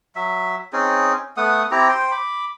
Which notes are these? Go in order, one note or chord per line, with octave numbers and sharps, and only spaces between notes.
F#3 E5
C4 C#4 D#4 G#4
A3 B3 F#5 D#6
C4 E4 G4 A#5
C5 G5
B5 D6